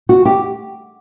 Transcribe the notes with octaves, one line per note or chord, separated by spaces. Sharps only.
F#4
G4